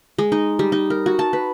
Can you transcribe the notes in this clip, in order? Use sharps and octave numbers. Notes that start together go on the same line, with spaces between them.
G#3
D#4
G3
D#4
A#4
F#4
A5
B4